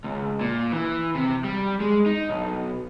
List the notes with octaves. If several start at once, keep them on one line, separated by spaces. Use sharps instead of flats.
C#2
A#2
E3
C3
G3
G#3
D#4
B1